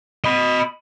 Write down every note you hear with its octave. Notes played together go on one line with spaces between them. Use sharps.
D#5 B5